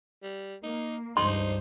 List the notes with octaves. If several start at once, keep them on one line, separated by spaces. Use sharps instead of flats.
G3
A#3 D#4
C#2 G2 D#4 C5 C6